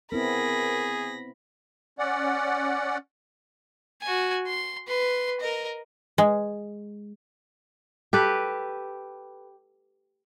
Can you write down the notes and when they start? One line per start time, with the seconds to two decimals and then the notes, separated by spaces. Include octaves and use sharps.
0.12 B3 C4 E4 G#4 A#4 B5 A#6
1.99 C#4 D5 F#5
4.02 F#4 G#5
4.47 C6
4.87 B4 C6
5.40 A#4 D#5
6.18 G#3
8.13 G4 A4 B4